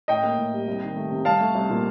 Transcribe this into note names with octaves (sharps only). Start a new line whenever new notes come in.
A2 D#5 G5
A#3
A2
G3
C2
D#3
A3
C3
C2 F5 A5
A3
C2
A#2